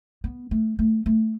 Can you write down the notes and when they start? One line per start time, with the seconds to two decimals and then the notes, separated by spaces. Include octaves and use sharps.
0.24 B3
0.51 A3
0.79 A3
1.06 A3